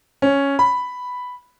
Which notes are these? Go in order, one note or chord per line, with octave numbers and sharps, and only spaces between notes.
C#4
B5